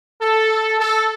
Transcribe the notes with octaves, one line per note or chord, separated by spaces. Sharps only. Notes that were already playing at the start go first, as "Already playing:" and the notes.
A4
A4